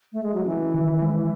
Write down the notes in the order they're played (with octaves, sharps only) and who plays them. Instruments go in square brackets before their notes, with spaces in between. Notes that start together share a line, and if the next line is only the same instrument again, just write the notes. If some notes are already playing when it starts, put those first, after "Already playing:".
[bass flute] A3
G#3
F#3
[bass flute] E3 [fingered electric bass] C#4
[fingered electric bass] D#3
G#3